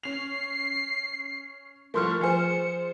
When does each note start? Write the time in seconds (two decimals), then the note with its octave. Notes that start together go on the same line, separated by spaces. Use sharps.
0.03 C#4 C7 F7
1.94 C2 F3 A3 A#4 C6 C#6 F6
2.21 F3 F4 G#4 C5 G#5 F6 C#7